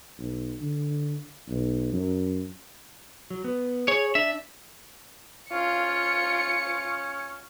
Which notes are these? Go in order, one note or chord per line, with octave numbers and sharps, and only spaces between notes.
B1
D3
B1
F#2
F#3
B3
G#4 C#5
D4 E5
C#4 F4 C#7